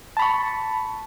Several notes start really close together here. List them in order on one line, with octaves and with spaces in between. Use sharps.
A5 B5 C#6